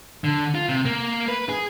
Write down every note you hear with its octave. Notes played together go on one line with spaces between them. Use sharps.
D3
F4
C3
A#3
B4
G#4